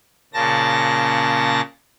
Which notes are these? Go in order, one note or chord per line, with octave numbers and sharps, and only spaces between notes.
A#2 C#3 A5 A#6